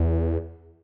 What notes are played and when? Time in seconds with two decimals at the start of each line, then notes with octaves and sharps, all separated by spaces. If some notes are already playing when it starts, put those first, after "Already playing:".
Already playing: E2